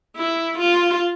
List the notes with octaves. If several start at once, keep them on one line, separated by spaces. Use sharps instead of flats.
E4
F4